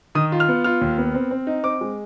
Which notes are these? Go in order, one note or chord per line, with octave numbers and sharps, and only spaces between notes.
D#3 D#6
F4
F6
B3
F4 F6
D#2
B3
C4
C4
D#4
C4 D6
G#3